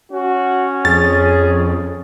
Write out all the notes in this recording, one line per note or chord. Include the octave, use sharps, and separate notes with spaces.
C#4 F#4
F2 G#4 A6